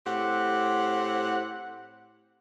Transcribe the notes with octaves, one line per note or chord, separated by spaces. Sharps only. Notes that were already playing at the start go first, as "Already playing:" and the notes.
A2 C4 G4 F#5